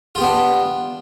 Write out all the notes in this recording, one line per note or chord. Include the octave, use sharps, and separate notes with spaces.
B3 D4 F4 G4